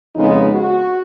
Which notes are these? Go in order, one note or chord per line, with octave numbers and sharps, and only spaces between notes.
F2 C#3 G#3 B3 D#4
F#4